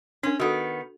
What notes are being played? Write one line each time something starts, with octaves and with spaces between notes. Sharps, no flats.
C#4 D4 A#4
D#3 B3 F#4 A4